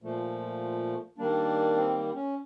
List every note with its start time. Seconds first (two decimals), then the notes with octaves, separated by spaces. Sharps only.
0.02 A#2 F3 A3
1.18 D#3 G3 A#3 D4
1.76 C4
2.15 C#4